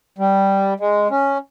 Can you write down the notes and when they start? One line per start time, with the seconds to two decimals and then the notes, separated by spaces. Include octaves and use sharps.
0.18 G3
0.80 G#3
1.10 C#4